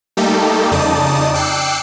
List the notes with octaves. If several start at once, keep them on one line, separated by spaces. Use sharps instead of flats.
G3 A3 A#3 D#4 G4 A4
F2 C#3 D#4 D5 A5 D#6
G5 D6 E6 F#6 C7 C#7